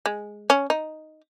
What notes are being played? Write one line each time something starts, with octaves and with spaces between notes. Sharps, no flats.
G#3
C#4
D#4